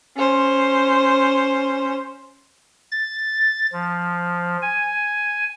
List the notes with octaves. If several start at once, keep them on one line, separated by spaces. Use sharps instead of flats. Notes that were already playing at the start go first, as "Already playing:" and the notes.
C#4 C5
A6
F3
G#5